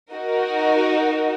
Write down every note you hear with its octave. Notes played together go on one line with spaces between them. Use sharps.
D#4 F#4 A#4